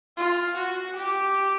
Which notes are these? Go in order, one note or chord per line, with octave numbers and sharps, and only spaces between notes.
F4
F#4
G4